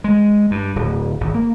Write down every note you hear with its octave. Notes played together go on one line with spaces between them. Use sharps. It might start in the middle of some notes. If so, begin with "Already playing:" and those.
G#3
G2
D1
G#1
A#3